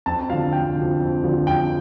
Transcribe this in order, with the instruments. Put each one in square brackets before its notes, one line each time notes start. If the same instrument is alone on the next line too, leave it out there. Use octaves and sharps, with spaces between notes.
[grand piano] F2 A5
D3 F3 F5
F2 G5
D3 F3
F2
D3 F3
F2 G5